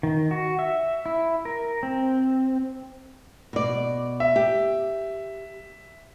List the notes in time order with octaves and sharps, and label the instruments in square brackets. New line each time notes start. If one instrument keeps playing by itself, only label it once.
[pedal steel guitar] D#3
F#4
E5
E4
A#4
C4
[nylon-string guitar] B2 D5
[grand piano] E5
[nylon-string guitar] G4